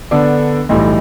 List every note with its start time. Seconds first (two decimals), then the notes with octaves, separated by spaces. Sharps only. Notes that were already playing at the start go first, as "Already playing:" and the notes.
0.11 D3 B3 D4 A4 D5
0.69 B1 A2 E3 G3